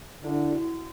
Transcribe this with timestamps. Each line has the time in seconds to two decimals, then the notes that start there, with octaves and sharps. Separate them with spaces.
0.24 D3 E4
0.52 F#4